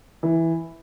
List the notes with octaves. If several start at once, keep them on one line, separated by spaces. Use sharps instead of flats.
E3